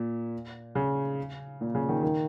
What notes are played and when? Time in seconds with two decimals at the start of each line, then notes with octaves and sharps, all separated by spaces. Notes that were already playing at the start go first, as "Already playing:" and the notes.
Already playing: A#2
0.75 C#3
1.61 A#2
1.75 C#3
1.89 D#3
2.03 D#3